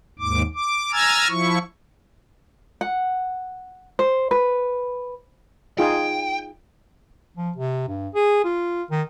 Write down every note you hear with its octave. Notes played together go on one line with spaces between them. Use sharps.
D#2 G#2 D6
D6
G#5 A#5 E6 F6 G#6 A6
F3 E4 C#6
F#5
C5
B4
D#4 F4 G#4 G5
F3
C3
G2
G#4
F4
D#3